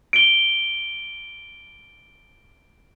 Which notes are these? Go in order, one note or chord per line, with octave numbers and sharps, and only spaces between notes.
D7 G7